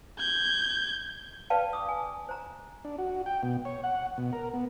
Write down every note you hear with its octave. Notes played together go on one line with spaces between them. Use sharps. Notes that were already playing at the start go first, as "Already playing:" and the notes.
G6 G#6
B4 D5 F5 G5 A5
D6 D#6
G#5
C5 A#5
D4
F#4
G5
B2
C#5
F#5
B2
A#4
B3